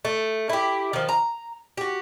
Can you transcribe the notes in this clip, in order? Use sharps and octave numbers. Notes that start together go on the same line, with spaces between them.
A3
E4 G4
D#3 F3
A#5
F#4 G4